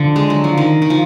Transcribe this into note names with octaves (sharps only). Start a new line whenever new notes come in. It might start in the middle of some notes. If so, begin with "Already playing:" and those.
Already playing: D3 F3
G#3
F#3
F3
D#3
D#3
F3